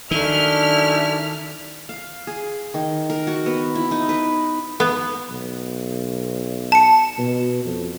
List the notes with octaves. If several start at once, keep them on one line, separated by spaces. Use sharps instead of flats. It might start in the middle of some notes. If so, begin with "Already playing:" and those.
F#2 D#3 A3 D4 E4 F6
F5
G#4
D#3
A#4
F#4
B3
E4
D#4
B4
B3
B1
A5 C#7
B2
F2